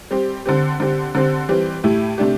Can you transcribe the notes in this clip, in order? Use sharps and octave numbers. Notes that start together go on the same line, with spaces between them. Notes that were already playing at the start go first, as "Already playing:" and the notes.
G3 C4 G4
D3 C4 G4
D3 C4 G4
D3 C4 G4
E3 G3 C4 G4
A2 A3 E4 G4
C3 A3 D4 G4